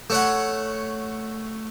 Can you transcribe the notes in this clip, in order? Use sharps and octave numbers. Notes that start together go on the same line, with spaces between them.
A3 C#5 F#5